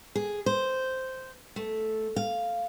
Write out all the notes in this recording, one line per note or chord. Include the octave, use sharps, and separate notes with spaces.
G#4
C5
A3
F5